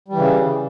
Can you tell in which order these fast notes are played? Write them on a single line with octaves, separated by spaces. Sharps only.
G3 E3 C#3